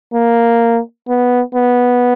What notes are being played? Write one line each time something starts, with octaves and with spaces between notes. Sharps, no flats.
A#3
B3
B3